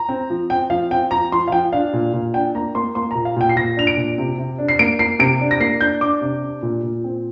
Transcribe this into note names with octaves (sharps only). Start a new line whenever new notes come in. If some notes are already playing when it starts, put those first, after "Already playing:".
Already playing: A#5
C4
F3
C4 G5
F3 F5
C4 G5
F3 A#5
F3 C6
F5
F3 G5
D4 F5
A#2
A#2
D4 G5
A#3 A#5
A#3 C6
A#3 C6
A#2 A#5
F5
A#2 G5
C7
A#2 A#6
D4 F7
D7
A#2
C3
C3
D4
C7
A#3 D7
A#3 C7
C3 D7
D4
A#6
A#3 C7
D4 G6
D4 D6
C3
D4
A#2
A#2
C4